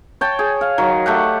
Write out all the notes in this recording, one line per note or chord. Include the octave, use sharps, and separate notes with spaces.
C#5 G5 A5
G#4
F5
D#3 F#3
A3 G4 F#5